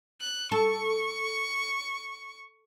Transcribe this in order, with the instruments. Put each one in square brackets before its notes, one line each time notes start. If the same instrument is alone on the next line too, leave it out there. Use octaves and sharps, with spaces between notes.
[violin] F#6
[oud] A4 [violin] C#6